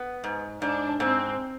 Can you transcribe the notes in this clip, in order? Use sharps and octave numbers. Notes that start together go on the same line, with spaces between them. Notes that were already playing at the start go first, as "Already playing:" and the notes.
Already playing: B3
G#2
G#2 D4
G#2 C4